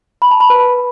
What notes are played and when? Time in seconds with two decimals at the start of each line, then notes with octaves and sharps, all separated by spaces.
0.22 B5
0.31 A5
0.40 B5
0.50 B4